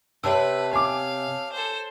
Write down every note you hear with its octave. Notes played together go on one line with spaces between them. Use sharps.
C3 B4 C#5 A5 E6
F5 G#5 D6
A4 C5